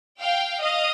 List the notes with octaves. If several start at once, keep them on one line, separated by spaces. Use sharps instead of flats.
F5 G5
D#5 F5